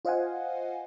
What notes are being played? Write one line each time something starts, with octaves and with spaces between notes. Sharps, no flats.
F4 C5 D#5 F5 F#5 G#5